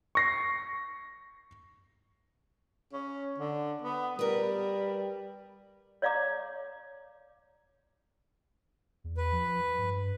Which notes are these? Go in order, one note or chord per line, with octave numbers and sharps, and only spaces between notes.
C#6 A#6 C7
C#4
D3
B3
G3 A#4 B4
C#5 D5 F5 A#5 D6
E2
B4
F3
G2